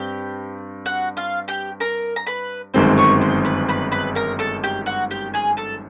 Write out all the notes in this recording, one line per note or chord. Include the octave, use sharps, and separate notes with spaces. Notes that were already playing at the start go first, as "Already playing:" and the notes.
Already playing: G2 C4 G4 G5
F#4 F#5
F4 F5
G4 G5
A#4 A#5
A#5
B4 B5
G1 F#2 D#3 G#3 C4 C5 C6
C#5 C#6
C5 C6
B4 B5
B4 B5
B4 B5
A#4 A#5
A4 A5
G4 G5
F#4 F#5
G4 G5
G#4 G#5
A4 A5